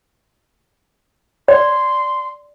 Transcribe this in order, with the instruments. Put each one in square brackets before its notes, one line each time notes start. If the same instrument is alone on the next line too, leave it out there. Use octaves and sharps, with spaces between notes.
[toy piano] D5 [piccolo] C6